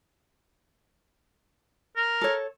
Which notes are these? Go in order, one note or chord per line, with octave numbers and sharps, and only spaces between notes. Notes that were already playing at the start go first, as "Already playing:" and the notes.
A#4
A4 C#5